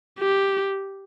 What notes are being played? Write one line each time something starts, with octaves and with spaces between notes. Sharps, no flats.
G4